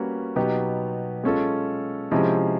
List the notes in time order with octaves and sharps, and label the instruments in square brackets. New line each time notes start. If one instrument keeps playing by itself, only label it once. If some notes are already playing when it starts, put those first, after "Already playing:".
Already playing: [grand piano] G3 A#3 C#4 F#4 B4
B2 F#3 B3 D#4 G4
G#3 C#4 F4 A4
C3 F3 G#3 C#4 E4